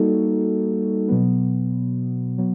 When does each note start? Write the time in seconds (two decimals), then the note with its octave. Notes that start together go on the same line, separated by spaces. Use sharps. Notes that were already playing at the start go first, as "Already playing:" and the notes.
Already playing: G3 A#3 D#4 F#4 A4
1.08 B2 F#3 B3
2.38 F#3 B3